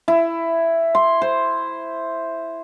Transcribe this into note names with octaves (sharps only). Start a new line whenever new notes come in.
E4
C6
C5